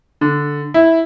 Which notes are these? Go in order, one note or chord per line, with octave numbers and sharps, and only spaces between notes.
D3
E4